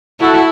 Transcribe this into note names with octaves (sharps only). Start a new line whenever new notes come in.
E4 F#4 A4